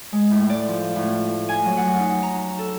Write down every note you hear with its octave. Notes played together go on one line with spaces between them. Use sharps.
G#3
A2
D5
F3
A2
G#5
F#3
F#5
D#4
A#5
A4